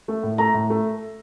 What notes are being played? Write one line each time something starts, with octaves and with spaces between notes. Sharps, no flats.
A3
A2
A3 A#5
A2
A3